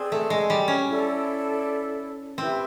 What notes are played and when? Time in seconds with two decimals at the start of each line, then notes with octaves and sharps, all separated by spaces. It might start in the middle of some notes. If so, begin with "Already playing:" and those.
Already playing: C4 G#4 B4 D5
0.12 A3
0.30 G#3
0.50 G3
0.68 C#4
0.87 E4 A4 D5
2.38 C4 E4 G4 B4 E5